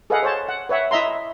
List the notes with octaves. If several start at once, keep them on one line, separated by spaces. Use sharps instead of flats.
G#4 A4 B4 D#5 F5 F#5
C5 C#5 A5
F#5
B4 C#5 E5 F#5
E4 D#5 E5 A#5 C6